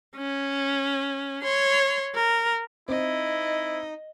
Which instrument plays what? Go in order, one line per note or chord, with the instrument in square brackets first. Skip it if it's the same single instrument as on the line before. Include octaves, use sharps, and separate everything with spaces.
[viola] C#4
C#5 C6
A#4
[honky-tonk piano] C4 [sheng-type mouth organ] D#4 [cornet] E4 [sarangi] D#5